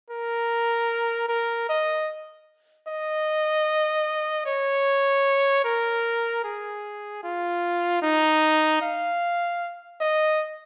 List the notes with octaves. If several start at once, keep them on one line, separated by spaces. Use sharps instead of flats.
A#4
A#4
D#5
D#5
C#5
A#4
G#4
F4
D#4
F5
D#5